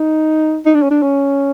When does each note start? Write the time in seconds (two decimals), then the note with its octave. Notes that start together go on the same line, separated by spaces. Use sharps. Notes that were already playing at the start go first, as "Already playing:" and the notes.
Already playing: D#4
0.65 D#4
0.75 D4
0.82 C#4
0.91 D4
1.02 C#4